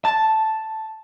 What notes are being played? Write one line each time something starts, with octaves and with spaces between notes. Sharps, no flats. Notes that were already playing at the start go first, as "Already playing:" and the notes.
A5